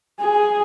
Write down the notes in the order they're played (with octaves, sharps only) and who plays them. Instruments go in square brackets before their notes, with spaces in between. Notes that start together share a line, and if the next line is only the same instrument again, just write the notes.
[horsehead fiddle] G#4